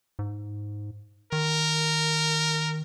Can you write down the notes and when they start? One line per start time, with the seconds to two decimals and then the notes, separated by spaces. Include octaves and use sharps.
0.19 G#2
1.32 D#3 A#4